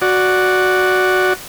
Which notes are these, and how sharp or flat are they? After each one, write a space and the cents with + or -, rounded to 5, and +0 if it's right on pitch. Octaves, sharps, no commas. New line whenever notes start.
F#4 +0 D5 +0